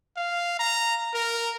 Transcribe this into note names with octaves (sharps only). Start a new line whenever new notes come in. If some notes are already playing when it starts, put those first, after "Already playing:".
F5
A#5
A#4